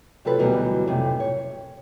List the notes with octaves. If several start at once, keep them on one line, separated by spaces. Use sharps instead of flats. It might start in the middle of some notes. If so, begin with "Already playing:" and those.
C3 F#3 F4 A4 B4
D2 B2 E3 F#3 G3
F2 A2 C3 A3
C#5